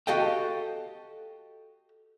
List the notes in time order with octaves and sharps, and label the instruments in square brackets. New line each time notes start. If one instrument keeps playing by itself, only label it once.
[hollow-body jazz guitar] F#4 G4 A4 D#5 F5 G5